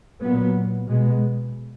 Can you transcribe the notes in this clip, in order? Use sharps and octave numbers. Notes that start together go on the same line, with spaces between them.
A#2 F#3 B3
B2 G#3 B3